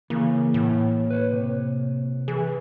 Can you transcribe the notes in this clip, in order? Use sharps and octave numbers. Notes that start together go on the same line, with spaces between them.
C#3 E3 A#3
A2
B4 C#5
C3
E3 G#4